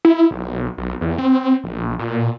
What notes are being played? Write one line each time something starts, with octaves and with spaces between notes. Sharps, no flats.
E4
B1
B1
E2
C4
A#1
A#2